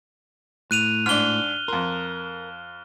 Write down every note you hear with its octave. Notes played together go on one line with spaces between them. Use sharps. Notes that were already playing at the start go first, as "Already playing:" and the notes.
A2 F#6 D#7 F7
G#2 D4 F6 G7
F2 A#4 C6